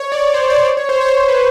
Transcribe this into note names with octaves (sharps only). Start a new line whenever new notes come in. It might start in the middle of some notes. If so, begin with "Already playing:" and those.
Already playing: C#5
D5
C#5
C5
D5
D5
C#5
C5
C#5
C5
C#5
C5
B4